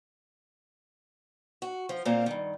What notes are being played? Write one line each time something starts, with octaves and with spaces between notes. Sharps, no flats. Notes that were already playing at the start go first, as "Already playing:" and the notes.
F#4
F3
A#2 A#3 C4 A#4
G2 D#3